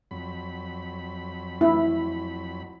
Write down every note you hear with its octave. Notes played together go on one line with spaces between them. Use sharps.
F2 F#3 B5
E4